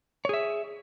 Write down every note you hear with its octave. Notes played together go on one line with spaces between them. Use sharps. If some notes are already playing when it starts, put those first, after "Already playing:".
G#4 C#5 E5